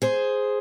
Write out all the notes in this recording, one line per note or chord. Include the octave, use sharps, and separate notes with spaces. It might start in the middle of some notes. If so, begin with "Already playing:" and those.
G#4 C5